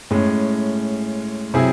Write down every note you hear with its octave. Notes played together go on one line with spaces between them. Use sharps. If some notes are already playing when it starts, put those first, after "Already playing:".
A2 G#3 C#4
C3 F#3 C4 E4 G#4